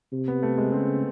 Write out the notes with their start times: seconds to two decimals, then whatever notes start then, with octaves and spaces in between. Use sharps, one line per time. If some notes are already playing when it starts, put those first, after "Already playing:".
0.12 C3
0.28 B3
0.43 A3
0.58 G#3
0.72 C#3 C4